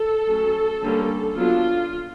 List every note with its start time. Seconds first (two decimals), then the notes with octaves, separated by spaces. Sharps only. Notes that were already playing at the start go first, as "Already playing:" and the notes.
Already playing: A4
0.28 F#3 A3 C#4
0.82 D3 G3 A#3 C#4
1.36 F#3 B3 D4 F4